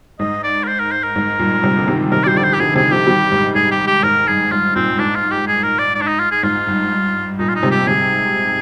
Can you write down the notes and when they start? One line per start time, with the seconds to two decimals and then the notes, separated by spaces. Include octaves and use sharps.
0.19 G#2 D#5
0.43 D5
0.64 A#4
0.68 C5
0.79 A#4
0.91 C5
1.03 A#4
1.16 G#2
1.39 G2 A#2
1.63 G#2 C3
1.77 D3
1.87 C3 D#3
2.12 C3 D#3 A#4
2.24 D5
2.26 G3 C5
2.35 D3 F3 D5
2.44 C5
2.54 G4
2.59 D3 F3 G#4
2.75 C3 D#3 G#4
2.91 D3 F3 G4
3.07 D#3 G3
3.32 G#2
3.55 G#2 G#4
3.71 G4
3.87 G4
4.03 G#2 A#4
4.27 G2 G#4
4.51 G#2 F4
4.75 G2 A#2 C4
4.92 G2
4.99 G#2 D4
5.15 F4
5.31 G4
5.47 G#4
5.63 A#4
5.79 D5
5.95 D5
6.01 D4
6.07 D#4
6.19 F4
6.31 G#4
6.43 G#2 F4
6.67 G2
7.39 G2 A#2 D#4
7.49 F4
7.55 D#4
7.63 G#2 C3
7.71 G4
7.87 G#2 C3 G#4